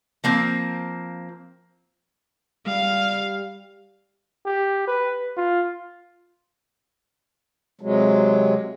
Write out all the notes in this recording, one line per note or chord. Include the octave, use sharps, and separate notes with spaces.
F3 A#3 C4
G3 F5
G4
B4
F4
C3 F#3 G#3